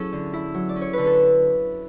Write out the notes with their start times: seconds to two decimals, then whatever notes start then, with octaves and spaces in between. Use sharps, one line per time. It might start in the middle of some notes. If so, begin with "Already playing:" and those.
Already playing: F#3 C#4 E4 G#4 A4
0.13 D3
0.33 E4
0.54 F#3
0.69 D5
0.76 C#4
0.81 C#5
0.93 D3 B4
1.06 A4